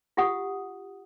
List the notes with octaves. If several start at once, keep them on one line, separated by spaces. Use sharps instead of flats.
F4 G4 F#5 D#6